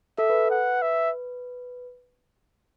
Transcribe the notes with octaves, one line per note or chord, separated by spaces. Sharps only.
A4 E5
B4
F#5
E5